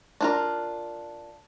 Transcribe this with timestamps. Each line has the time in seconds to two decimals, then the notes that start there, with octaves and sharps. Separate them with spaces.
0.21 D4 F4 A#4